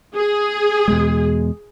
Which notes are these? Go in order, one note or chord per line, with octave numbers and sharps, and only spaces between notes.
G#4
E2 B2 G#3